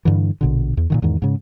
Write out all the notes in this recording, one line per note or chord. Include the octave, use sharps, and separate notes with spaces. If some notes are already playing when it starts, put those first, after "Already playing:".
G2 D3 E3
A#1 B2 D3
E2
A#2 D3 D#3
E2 G#2 D#3
G#2 C#3